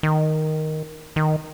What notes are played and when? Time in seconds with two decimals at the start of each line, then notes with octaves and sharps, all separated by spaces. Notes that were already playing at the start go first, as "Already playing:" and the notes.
0.03 D#3
1.16 D#3